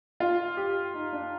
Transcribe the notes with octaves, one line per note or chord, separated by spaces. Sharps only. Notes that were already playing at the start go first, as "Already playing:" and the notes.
F4
G4
D#4
D4